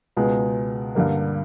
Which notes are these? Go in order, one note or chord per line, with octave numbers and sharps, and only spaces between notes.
C#2 B2 G#3 B3
G2 D3 G3 A#3